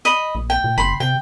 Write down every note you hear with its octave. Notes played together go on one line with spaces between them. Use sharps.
D#5 B5
A#1
G5
A#2
F#1 B5 C6
C3 G5